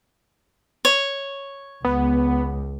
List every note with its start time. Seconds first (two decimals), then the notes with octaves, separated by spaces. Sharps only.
0.85 C#5
1.85 C#2 B3